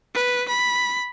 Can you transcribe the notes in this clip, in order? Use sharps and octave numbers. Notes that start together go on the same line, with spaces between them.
B4
B5